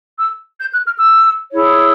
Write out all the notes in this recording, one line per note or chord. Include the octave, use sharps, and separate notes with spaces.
E6
G6
F#6
F6
E6
E4 G#4 C#5